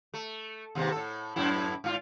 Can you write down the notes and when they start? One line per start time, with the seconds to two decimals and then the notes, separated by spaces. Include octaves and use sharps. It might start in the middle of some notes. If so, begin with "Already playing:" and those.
0.14 A3
0.75 D#2 G#2 C3
0.91 A2 A4
1.36 F#2 A2 E4
1.84 G#2 F4